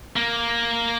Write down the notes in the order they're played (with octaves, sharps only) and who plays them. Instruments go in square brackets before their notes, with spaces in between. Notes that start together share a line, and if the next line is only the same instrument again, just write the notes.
[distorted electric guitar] A#3